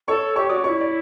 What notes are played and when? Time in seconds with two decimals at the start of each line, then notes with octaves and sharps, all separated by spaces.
0.08 A4 C#5 C#6
0.36 G4 C#5 C#6
0.49 F#4 D5 D6
0.64 F#4 C#5 C#6
0.68 E4
0.81 D5